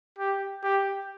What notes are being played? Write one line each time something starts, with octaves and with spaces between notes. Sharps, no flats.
G4
G4